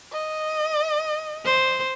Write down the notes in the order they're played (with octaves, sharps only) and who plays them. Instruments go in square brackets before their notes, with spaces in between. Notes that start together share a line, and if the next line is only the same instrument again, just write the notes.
[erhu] D#5
[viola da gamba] C5